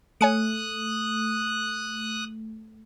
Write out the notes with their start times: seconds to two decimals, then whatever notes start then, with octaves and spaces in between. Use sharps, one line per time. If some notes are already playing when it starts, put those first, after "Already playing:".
0.21 A3 C#5 G#5 D#6 F#6 C#7